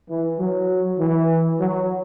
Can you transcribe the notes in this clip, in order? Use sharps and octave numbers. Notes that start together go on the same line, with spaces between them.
E3
F#3
E3
F#3